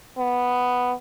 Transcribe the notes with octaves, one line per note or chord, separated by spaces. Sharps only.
B3